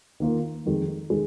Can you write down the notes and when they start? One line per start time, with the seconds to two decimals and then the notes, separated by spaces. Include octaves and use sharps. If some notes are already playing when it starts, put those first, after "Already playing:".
0.20 D#3 A#3 F4 A#4
0.66 F2 D#3 G#3
1.10 D#3 G#3